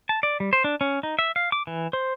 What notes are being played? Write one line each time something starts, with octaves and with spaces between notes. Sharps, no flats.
A5
D5
G3
C5
D4
C#4
D#4
E5
F5
D6
E3
C5